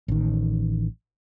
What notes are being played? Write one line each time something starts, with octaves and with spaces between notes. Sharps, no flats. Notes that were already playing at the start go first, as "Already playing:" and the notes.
A1 D#3